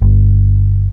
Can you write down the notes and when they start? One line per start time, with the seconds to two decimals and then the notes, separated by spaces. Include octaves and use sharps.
0.02 G1